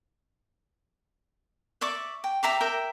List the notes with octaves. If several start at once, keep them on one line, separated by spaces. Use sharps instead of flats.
D5 E5 C#6 D6
G5
G4 E5 A#5 D6
A#4 E5 G5